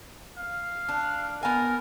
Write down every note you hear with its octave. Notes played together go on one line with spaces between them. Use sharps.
F5
D4
B3 A#4 G#5